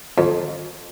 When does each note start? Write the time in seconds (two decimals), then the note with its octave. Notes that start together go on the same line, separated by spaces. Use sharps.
0.18 F2